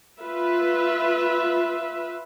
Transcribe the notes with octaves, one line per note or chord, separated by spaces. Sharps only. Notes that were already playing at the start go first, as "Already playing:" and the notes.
F4 B4 E5